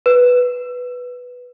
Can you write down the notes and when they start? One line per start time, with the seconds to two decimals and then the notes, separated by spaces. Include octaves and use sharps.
0.06 B4